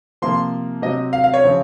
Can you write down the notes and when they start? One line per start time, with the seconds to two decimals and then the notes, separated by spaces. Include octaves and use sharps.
0.22 C3 F3 A#3 C6
0.82 C3 F#3 C4 D#5
1.13 F5
1.24 F5
1.34 C#5
1.44 C#3 F3 C4